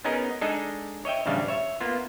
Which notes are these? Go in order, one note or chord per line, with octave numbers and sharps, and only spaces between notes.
B3 C#4 D#4 G#4 A#4
G#3 D4 D#4 G#4 A4
C#5 D#5 E5 G5
A1 D2 C#3 G3 D4 F5
C#5 E5
A#3 B3 F4